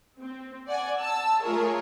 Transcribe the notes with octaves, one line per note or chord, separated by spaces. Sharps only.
C4
D5 F#5 G#5
A5 E6
A3 F4 G#4 A#4 C#5